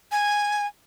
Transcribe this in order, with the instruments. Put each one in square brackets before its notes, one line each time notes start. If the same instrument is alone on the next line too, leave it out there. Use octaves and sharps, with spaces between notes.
[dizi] G#5